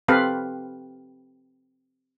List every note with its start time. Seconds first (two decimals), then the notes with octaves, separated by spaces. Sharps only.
0.08 C4 G4 A4 B4 F5